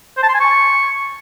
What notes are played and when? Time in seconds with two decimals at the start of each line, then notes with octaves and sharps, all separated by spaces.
0.17 C5
0.23 A5
0.29 C6
0.35 G#5
0.40 C#6